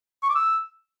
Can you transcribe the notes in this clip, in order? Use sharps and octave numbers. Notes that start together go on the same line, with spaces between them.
C#6
D6
E6